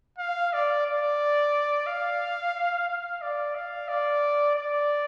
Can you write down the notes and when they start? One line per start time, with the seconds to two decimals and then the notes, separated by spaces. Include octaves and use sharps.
0.18 F5
0.53 D5
0.87 D5
1.86 F5
2.88 F5
3.22 D5
3.55 F5
3.88 D5
4.55 D5